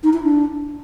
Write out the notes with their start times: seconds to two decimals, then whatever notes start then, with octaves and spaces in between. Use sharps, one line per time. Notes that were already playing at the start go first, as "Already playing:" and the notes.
0.03 D#4
0.13 E4
0.23 D4